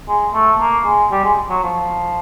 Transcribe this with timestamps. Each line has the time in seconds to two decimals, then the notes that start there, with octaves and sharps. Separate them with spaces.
0.08 G#3
0.34 A3
0.59 A#3
0.85 G#3
1.11 G3
1.24 G#3
1.49 F#3
1.63 F3